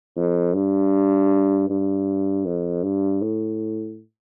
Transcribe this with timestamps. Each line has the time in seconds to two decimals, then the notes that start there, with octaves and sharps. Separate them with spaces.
0.16 F2
0.55 G2
1.69 G2
2.46 F2
2.83 G2
3.22 A2